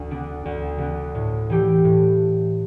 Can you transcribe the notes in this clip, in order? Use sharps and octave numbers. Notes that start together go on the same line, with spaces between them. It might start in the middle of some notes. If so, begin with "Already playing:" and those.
Already playing: D2
D3 B3 D4
D2
D3 B3 D4
A2
E3 A3 G4
A2